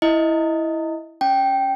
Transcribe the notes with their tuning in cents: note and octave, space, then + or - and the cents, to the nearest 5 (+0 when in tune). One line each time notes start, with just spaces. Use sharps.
E4 +0 D#5 +10
C#4 +0 G5 -5